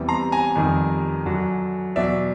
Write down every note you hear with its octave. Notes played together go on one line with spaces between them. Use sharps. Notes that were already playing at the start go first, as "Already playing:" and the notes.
Already playing: E2 C3 E3 G3
A#5 C6
G#5 A#5
F2 C3 D#3 G3
F#2 D3 F#3
E2 B2 F#3 D5 E5